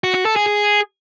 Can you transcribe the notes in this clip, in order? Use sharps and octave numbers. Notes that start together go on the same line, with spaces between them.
F#4
F#4
A4
G#4
G#4